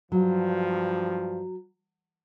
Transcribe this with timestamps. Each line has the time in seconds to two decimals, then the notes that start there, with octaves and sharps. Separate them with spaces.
0.12 G2 F3 F#3